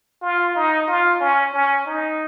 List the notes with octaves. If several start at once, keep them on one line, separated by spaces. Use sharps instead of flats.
F4
D#4
F4
C#4
C#4
D#4